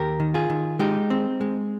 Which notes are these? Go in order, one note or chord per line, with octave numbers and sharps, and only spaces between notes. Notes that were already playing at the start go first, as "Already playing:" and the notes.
Already playing: D#2 G4 A#4
D#3
F4 G#4
D#3
G#3 D#4 G4
C4
G#3